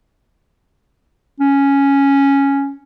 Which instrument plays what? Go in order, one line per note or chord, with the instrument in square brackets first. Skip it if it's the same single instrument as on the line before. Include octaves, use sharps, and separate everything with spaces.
[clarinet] C#4